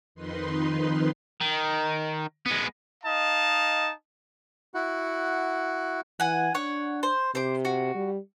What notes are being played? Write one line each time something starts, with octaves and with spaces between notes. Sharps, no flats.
F2 D#3 D#4 B4 C6
D#3
G#3 B3
D#4 D#5 F5 A5
E4 F#4 F#5
E3 F#5 G#5
D4 C#5 F#5
C5
C3 C5 D6
F#4
G3